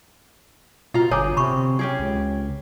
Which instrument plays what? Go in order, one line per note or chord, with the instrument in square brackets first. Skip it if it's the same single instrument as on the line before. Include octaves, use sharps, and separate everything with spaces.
[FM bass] B2 [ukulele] F4 A#5
[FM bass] G1 [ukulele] G#4 [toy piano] C#5 G#5 D6
[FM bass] C3 [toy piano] B5 C#6
[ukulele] C#4 G4 G#4
[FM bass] C#2